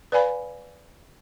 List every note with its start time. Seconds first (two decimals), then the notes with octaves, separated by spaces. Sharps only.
0.12 B4 D5 F5 G#5 B5